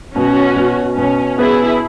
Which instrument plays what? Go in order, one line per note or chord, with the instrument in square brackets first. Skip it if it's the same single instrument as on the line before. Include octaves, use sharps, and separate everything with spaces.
[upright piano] B2 [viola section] C#4 F#4
[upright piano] B2
[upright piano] B2 [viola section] C#4
[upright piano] B3 [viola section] E4 G#4